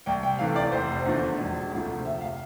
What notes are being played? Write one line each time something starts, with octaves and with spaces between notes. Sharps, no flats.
C2 G5
G5
C3 E3 A3 F5
D5
F1 C5
E2 D3 F3 A3
E1
D2 C3 F3 A3
F1 E5
F5